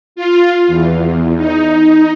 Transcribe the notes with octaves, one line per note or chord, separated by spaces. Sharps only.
F4
E2
D#4